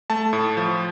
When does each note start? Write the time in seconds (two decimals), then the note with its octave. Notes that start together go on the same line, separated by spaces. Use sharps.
0.10 A3 A5
0.33 A2
0.57 F3